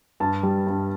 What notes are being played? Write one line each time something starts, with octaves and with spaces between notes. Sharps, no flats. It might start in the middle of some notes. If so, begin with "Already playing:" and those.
G2 A5
G3
G2